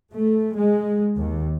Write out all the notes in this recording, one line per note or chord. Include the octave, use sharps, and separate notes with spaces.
A3
G#3
D#2